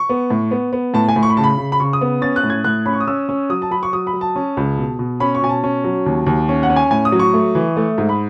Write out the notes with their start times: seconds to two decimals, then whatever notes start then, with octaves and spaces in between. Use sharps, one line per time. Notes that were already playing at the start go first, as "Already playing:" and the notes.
Already playing: C#6
0.09 B3
0.30 A2
0.51 B3
0.73 B3
0.94 A2 A5
1.09 G#5
1.16 A2
1.23 C#6
1.30 B5
1.37 C#3 A5
1.44 B5
1.58 C#3
1.72 B5
1.80 C#3 C#6
1.93 D#6
2.01 B3
2.21 C#4 A6
2.36 F#6
2.43 A2
2.50 G#6
2.64 A2 F#6
2.86 C#4 B5
2.93 C#6
3.00 D#6
3.07 C#4 E6
3.29 C#4
3.50 F#3 D#6
3.62 A5
3.71 F#3 B5
3.83 C#6
3.93 F#3 D#6
4.07 B5
4.14 F#3
4.21 A5
4.36 C#4
4.57 C#2
4.78 B2
4.99 B2
5.20 C#4 B5
5.35 C#6
5.42 B2 G#5
5.49 A5
5.64 C#4
5.84 F#3
6.06 D#2
6.26 D#2
6.49 C#4
6.63 F#5
6.70 C#4
6.76 G#5
6.91 A2 G#5
7.05 D#6
7.12 F#3
7.20 C#6
7.34 A3
7.55 E3
7.77 A3
7.98 G#2
8.09 B5